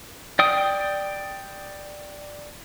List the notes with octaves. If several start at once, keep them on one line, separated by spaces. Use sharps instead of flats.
D5 G5 D#6